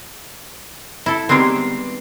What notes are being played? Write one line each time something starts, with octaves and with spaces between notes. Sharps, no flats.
E4 A4
D#3 G3 G#3 B3 C4